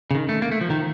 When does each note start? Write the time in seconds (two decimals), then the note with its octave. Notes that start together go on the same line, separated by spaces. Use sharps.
0.11 C#3
0.15 D#3
0.29 A3
0.42 A#3
0.52 A3
0.61 F3
0.70 D#3